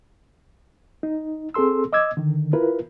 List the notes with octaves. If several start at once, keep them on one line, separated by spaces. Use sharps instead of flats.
D#4
C4 G#4 A4 C6 E6
D#5 D6 E6 G#6
D3 D#3
E4 F4 A#4 B4